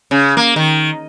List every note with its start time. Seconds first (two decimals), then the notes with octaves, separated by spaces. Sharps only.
0.11 C#3
0.37 A#3
0.56 D#3